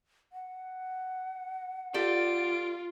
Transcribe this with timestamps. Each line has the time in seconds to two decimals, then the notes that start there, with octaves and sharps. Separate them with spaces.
0.33 F#5
1.94 F4 G4 A4 D5 D7